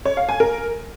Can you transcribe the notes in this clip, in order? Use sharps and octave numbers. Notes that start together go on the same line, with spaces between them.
C#5
F5
G#5
A#4